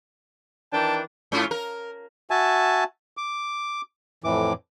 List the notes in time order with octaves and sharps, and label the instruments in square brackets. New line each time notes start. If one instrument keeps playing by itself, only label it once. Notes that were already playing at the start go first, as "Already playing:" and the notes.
[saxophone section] D#3 E3 D4 [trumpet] G5 [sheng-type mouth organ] A5
[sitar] G#2 C#4 F4
A#4
[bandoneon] F#4 E5 G#5 A5
D6
F2 A2 E3 D6